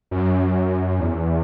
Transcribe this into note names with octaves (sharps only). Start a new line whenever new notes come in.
F#2
E2